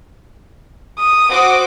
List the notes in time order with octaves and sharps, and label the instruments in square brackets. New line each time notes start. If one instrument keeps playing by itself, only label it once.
[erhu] D#6
[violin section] F#4 C5 D6